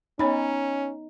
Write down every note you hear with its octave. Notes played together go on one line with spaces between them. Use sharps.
B3 C#4 D#4 C#5 B5